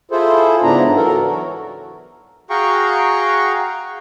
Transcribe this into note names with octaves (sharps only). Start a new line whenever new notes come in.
E4 F4 G#4 A4 C5
G#2 C#3 B3 D4 E4 A#5
E3 F#3 A4 A#4
F#3 F#4
F#4 G#4 F5 G5 A#5 C#6